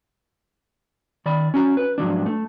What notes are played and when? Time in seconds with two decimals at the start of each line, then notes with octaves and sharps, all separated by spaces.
1.26 D#3 D5 B5
1.54 C#4 F#4 A#5
1.77 B4
1.98 G#2 F3 F#3 D4
2.26 A3